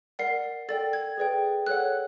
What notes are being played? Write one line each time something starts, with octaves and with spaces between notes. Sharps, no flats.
A#4 D5 F#5 C7
A4 D5 G5 A6
G#6
G#4 B4 D5 G5
A4 C#5 F#5 F#6